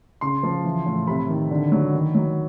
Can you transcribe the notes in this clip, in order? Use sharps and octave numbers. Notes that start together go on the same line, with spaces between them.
C#3 C6
F3
E3
A2
C3 B5
D#3
D3
F#3
D#3
F#3